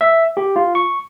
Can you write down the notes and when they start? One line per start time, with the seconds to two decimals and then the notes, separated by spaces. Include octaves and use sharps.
0.01 E5
0.37 G4
0.56 F4
0.75 C#6